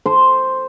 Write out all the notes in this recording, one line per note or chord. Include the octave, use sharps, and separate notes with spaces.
C5